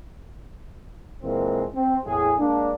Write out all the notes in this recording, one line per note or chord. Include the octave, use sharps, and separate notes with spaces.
A#2 E3 G#3 A#3 C4
C4
E2 A2 G#4
G#3 A#3 D4